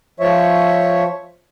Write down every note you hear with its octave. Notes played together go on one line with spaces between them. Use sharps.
F3 C#5 E5